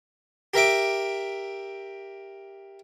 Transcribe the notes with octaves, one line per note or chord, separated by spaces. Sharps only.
G4 A#4 E5 D6